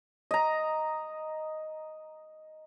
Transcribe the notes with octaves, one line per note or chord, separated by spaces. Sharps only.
D#5 A#5